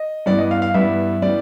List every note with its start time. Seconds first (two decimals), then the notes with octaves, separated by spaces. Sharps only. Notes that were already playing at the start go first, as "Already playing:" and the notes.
Already playing: D#5
0.26 G2 E3 G3 B3 D5
0.38 D#5
0.51 F5
0.62 F5
0.74 G2 E3 G3 B3 E5
1.22 E3 G3 B3 D5